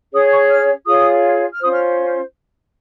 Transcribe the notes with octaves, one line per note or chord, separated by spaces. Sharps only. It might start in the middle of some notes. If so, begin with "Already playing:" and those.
C#4 G#4 C#5 D#6
C#6
F6
F4 G#4 C#5 D#6
F6
C#4 F4 C5 D#6
F6